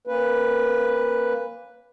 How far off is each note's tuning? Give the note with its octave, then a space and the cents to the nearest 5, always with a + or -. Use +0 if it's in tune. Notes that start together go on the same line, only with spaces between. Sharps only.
A#3 +0 C#4 -40 B4 +0